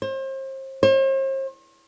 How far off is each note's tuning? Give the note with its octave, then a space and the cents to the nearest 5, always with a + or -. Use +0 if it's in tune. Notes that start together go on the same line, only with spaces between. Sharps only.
C5 +35
C5 +45